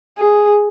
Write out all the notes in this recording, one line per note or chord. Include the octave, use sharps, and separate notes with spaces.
G#4